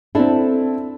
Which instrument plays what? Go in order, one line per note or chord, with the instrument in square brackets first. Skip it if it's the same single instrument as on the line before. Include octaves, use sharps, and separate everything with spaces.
[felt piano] C4 E4 [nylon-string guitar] D4 A4